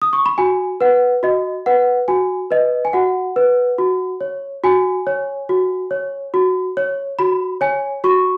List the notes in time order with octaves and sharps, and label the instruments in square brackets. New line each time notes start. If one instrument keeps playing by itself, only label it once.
[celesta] D#6
C#6
B5
F#4 G#5
B4 F#5
F#4 D#5
B4 F#5
F#4 G#5
B4 D#5
G#5
F#4 F#5
B4
F#4
C#5
F#4 G#5
C#5
F#4
C#5
F#4
C#5
F#4 B5
C#5 G#5
F#4 C#6